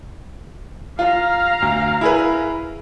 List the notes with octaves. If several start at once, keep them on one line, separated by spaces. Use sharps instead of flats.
F4 F5 A#5
D2
E4 G#4 B4